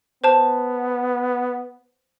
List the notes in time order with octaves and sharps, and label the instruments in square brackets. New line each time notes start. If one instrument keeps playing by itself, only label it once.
[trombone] B3 [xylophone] C5 A5